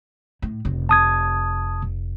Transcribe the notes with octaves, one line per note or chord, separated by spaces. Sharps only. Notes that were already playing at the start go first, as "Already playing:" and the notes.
A2
F1
A5 D#6 G#6